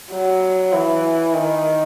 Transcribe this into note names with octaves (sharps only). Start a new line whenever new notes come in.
F#3
E3
D#3